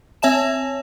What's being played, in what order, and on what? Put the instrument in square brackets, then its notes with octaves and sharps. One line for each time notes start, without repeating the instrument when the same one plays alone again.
[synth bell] C4 C#5 E5 G#5 A5 E7